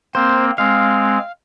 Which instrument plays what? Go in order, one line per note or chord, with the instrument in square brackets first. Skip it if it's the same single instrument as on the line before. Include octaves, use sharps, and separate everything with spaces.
[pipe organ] A#3 C4 [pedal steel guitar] C5
[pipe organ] G#3 C4 [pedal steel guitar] F5